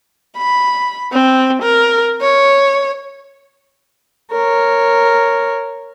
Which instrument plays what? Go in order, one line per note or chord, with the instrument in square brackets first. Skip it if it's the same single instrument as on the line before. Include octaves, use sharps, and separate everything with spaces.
[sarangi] B5
C4
A#4
C#5
[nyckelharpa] A#4 C#5